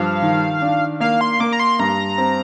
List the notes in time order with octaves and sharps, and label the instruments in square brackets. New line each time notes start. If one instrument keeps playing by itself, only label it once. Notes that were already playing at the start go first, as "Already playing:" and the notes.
Already playing: [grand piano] G2 F3 [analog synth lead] F5
[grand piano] D#3
D4
[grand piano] A#3 [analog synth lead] F5
[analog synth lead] C6
[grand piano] A#3 [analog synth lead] D6
[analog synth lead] A#5
C6
[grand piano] G2 [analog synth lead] A#5
[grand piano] C4